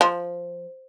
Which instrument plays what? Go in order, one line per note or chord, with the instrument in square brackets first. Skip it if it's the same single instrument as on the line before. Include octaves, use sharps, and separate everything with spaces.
[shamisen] F3